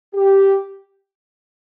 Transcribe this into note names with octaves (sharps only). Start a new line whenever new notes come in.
G4